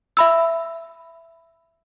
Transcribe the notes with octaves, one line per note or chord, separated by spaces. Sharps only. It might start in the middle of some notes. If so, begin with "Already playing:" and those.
E5 B5 E6